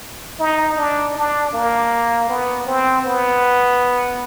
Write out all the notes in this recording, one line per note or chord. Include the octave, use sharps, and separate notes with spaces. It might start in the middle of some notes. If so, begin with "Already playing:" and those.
D#4
D4
D4
A#3
B3
C4
B3